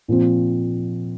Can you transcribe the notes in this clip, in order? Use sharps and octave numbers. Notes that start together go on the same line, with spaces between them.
A#2 F3 C4